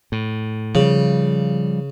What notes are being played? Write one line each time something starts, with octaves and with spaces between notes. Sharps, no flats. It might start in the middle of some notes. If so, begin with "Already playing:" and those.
A2
C#3 F3 G3